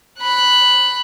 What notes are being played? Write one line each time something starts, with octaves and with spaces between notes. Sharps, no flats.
B5 F#6